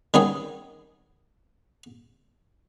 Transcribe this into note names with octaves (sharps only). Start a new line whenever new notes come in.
D#3 G3 B3 C#4 G#4